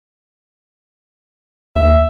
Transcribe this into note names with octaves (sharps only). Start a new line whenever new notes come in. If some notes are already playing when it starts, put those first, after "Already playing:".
D#2 E5